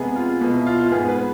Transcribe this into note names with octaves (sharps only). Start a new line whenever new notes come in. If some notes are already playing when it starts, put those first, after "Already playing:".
Already playing: C3 G#3 B3 G#4
F4
B2 B3
E4
F4
F4
G#2 G#3 B3 G#4
B4